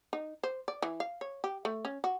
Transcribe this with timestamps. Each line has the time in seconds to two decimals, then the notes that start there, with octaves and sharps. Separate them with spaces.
0.13 D#4
0.43 C5
0.68 D5
0.82 E3
1.00 F5
1.21 C#5
1.44 G4
1.65 A3
1.85 C#4
2.04 F#4